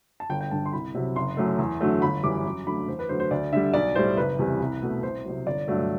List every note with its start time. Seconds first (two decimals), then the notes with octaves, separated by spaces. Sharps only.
0.20 A5
0.30 G1 G5
0.41 G5
0.51 G2 D3 A5
0.66 C6
0.73 C2 B5
0.95 C3 F#3
1.16 F#1 C6
1.37 F#2 F#3 A3
1.58 E2
1.81 D3 F#3 A3
2.02 G1 B5
2.23 F#2 E3 G3 D6
2.45 F#2
2.66 D3 F#3 A3 B5
2.88 E2 C5
2.99 B4
3.09 D3 F#3 A3 C5
3.20 C5
3.31 D2 D5
3.53 D3 G3 E5
3.74 B1 D5
3.95 A2 G3 C5
4.17 F#1 B4
4.39 E2 C3 G3
4.60 C2
4.82 B2 A3
5.03 C2 C5
5.25 C3 F#3
5.46 G1 D5
5.68 G2 F#3 A3